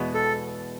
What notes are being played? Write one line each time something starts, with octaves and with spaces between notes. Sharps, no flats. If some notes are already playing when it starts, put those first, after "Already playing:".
Already playing: E2 B2 G#3 B3
A4